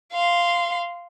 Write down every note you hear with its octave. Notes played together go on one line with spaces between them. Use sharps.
F5 C6